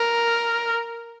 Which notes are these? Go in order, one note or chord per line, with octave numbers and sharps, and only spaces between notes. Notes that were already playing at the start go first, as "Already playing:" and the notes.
Already playing: A#4